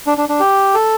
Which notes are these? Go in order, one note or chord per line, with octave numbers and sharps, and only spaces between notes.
D4
D4
D4
G4
A4